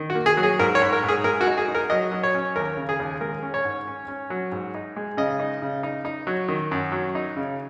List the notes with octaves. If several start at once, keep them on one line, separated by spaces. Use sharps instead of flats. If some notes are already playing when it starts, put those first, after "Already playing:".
Already playing: D#3
F#4
A#3
G#4
F#3
G#4
G#2 A#4
C#5
G#2
A#4
G#2 G#4
G#3 A#4
F#4
D#4
G#4
D#4
A#4
F#3 D#5
F#3
C#5
C#4
D#2 A#4
C#3
G#4
D#2
G#3 A#4
C#4
C#5
G#2
C#4
C#4
F#3
G#2
D#4
G#3
C#3 D#5
D#4
C#3
D#4
D#4
F#3
D#3
F#2
F#3
D#4
C#3